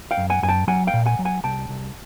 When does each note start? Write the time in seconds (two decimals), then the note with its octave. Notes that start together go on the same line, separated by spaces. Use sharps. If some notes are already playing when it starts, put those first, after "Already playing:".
0.11 F5 G5
0.17 F#2
0.30 F#5 G#5
0.43 F#2 G#5
0.49 G5 A5
0.67 F#3 F#5 G#5
0.87 F5 G5
0.94 A#2
1.06 F#5 G#5
1.19 F#3
1.25 F#5 G#5
1.44 C2 G5 A5
1.69 C2